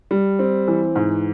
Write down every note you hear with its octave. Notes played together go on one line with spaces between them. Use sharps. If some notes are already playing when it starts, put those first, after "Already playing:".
G3
C4
E3
G#2